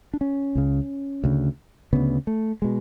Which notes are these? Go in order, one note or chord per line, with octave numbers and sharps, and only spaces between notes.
D4
C#4
C#2 C#3
D2 C#3
D2 C#3 B3
A3
B2 G#3